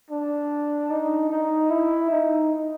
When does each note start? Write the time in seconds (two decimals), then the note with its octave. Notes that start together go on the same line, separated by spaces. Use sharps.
0.11 D4
0.91 D#4
1.30 D#4
1.70 E4
2.11 D#4